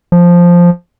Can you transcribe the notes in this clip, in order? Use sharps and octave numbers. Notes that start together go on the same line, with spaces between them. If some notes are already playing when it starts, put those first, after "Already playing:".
F3